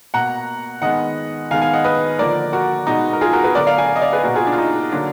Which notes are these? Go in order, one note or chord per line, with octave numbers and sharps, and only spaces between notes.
B2 A#3 F#5 A#5
D#3 G#3 B3 D#5 F#5
D#3 G#3 B3 F5 G#5
F5 G#5
D#5 F#5
B4 D#5
D3 F3 A#3 A#4 D5
F#4 A#4
B2 G#3 B3 D#4 F#4
A#4
F4 G#4
F#4 A#4
G#4 B4
D3 F#3 B3 A#4 D5
D5 F5
F5 G#5
D#5
D5 F5
G#4 B4
B2 A#3 F#4 A#4
F4 G#4
D4
F4
D#4
D3 F#3 A#3 D4